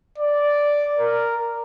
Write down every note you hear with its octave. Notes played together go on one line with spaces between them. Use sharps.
D5
A#4